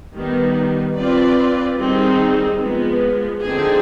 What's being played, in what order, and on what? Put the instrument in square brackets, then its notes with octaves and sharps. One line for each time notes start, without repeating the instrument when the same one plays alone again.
[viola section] D#3 G3 B3
C4 F4 B4 D5
D#3 G3 C4 D#4 G#4
F3 G#3 B3
D3 F3 C4 D#4 G#4